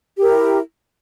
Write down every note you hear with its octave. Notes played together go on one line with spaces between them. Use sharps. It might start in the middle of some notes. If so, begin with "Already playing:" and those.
E4 G4 A#4